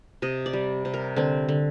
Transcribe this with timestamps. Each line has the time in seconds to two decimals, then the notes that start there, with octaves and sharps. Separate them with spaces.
0.22 C3 D#5
0.46 D5
0.53 G3
0.85 C3
0.94 A#4
1.16 D3 C4
1.49 D3